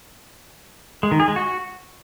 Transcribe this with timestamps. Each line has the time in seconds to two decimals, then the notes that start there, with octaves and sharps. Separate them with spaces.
1.03 G#3
1.11 D#3
1.20 G#4
1.28 G#3
1.36 F#4